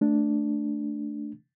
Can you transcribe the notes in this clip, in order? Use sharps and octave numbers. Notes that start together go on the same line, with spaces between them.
A3 D4